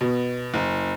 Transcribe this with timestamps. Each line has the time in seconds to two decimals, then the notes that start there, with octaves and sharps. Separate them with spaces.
0.01 B2
0.54 F#1